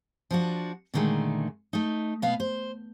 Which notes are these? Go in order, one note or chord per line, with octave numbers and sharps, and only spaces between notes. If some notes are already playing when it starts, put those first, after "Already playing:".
F3 D4 F#4
A#2 D3 D#3 G#3 A3
A3 D#4
B2 B3 F5
C5